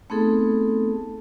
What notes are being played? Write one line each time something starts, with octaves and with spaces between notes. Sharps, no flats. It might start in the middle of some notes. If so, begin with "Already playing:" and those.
A3 B3 C4 D#4 G#4 A4